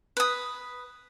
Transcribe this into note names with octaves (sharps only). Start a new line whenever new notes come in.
B4 D#6